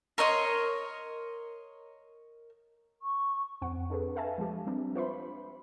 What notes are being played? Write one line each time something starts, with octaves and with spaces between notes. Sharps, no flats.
A#4 C#5 D#5 C6
C#6
F2 C4 F#5
D4 G#4 A4 B4
A4 B4 E5 F5 G#5 A5
F3 G#3 G4
G3 C4 D4
F4 B4 C5 E5 B5 C6